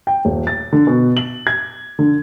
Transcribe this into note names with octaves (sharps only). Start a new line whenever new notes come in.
G5
D#1
A6
D3
B2
F#7
G#6
D3